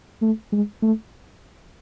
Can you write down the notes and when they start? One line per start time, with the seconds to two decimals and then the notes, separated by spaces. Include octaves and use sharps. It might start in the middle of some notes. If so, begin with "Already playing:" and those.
0.22 A3
0.52 G#3
0.82 A3